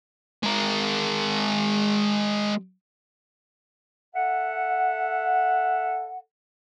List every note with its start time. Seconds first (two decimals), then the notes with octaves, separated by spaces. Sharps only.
0.43 G#3 A#4
4.15 A4 E5 F#5